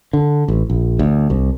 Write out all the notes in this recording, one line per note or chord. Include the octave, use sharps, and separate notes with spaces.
D3
A1
A#1
D2
C2